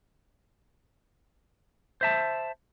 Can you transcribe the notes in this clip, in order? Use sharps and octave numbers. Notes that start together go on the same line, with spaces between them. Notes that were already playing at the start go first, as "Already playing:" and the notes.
C5 E5 A5